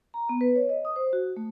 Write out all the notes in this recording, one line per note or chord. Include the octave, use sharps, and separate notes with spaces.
A#5
B3
B4
C#5
D#5
D#6
C5
F#4
A3